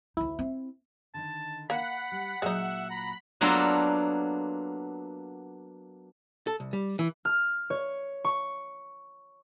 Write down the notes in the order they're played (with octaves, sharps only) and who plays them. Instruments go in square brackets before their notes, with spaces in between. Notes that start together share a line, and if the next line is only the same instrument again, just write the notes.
[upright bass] D2 D#4 [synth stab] E4
[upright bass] C4
[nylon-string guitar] D3 D#3 D#4 [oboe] A5
[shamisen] A#3 [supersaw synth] F#5 [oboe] B5
[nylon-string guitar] G3
[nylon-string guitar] A#2 F#3 F4 [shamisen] G#3 D#4 [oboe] E5
[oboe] A#5 [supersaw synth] B5
[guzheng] F#3 A#3 B3 D4 F4 A4
[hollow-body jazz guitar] A4
C2
G3
E3
[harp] F6
C#5
C#6